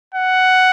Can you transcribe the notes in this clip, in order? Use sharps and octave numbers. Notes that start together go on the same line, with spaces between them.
F#5